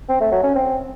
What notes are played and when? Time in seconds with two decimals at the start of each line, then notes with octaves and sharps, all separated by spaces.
0.09 C4
0.20 A3
0.32 F#3
0.44 C#4
0.55 C4